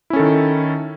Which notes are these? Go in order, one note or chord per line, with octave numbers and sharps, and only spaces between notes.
D#3 C#4 E4 A4